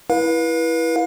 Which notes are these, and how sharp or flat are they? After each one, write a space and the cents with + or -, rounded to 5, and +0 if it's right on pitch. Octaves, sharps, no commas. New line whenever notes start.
E4 +0 B4 -30 F5 +30